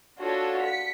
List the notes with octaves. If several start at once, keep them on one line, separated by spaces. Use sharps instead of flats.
D4 F4 F#4 A4 C#5
B6 C#7